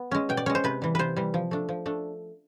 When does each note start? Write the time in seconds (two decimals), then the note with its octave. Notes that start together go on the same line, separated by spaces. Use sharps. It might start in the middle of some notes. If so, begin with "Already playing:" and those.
Already playing: B3
0.11 G#3 C#4
0.29 B2 G5
0.37 D5
0.46 G#3 C#4 C#5
0.55 C5
0.64 C3 B4
0.82 E3 G3
0.95 C3 B4 C5
1.17 E3 G3
1.34 F3
1.51 A3 D4
1.69 F3
1.86 A3 D4